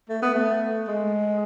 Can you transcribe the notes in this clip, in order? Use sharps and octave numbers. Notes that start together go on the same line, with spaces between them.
A3
B3
A3
G#3